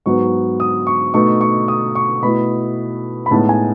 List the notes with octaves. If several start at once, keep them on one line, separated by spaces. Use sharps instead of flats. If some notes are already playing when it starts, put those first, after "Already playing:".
G#2 F#3 B3 C#6
D#6
C#6
B2 A3 D#4 C#6
C#6
D#6
C#6
B2 A3 E4 B5
B5
A2 G#3 B3 D#4 A5
G#5